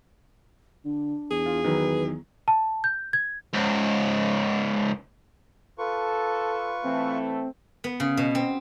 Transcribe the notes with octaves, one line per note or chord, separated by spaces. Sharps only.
D3 D4
E2 G#4
F4
D#3 F#3 B4
A5
G6
G#6
C#2 G#2
F4 A4 B4 C#6
E3 A3 C4
B3
C#3
B2
C4